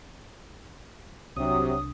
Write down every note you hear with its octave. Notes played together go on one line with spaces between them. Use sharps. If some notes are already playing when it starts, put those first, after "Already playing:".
C2 C3 F#3 D4 D#6